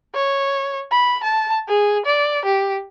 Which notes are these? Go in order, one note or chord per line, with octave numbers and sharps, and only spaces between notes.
C#5
B5
A5
G#4
D5
G4